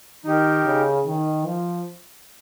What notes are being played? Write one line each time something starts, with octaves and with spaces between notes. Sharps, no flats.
D#3 D#4 G4 A#4
C#3
D#3
F3